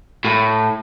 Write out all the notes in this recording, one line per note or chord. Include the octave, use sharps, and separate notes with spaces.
A2